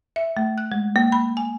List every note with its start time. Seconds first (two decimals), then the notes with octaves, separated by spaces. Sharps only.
0.16 E5
0.37 A3
0.58 F#6
0.72 G#3
0.96 A#3
1.12 B5
1.37 G#5